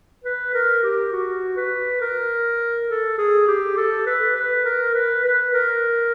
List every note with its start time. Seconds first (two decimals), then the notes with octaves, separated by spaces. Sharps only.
0.24 B4
0.54 A#4
0.83 G4
1.12 F#4
1.57 B4
2.01 A#4
2.89 A4
3.18 G#4
3.48 G4
3.77 A4
4.07 B4
4.36 B4
4.65 A#4
4.94 B4
5.24 B4
5.53 A#4